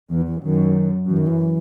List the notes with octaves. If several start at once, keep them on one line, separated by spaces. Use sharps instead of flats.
E2 E3
E3
F#2 D#3
F#2 E3
D#3
E3